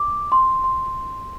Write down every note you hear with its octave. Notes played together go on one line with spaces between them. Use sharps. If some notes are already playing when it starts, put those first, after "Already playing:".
Already playing: D6
C6
C6